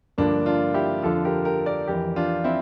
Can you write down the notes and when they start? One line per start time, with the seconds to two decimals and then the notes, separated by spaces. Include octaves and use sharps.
0.18 G2 D3 F3 A#3 D4
0.46 D4 F4
0.74 E4 G4
1.03 F2 D3 F3 F4 A4
1.25 G4 A#4
1.45 G4 A#4
1.66 A#4 D5
1.88 F2 E3 G4 A#4
2.16 D4 F4
2.44 C4 E4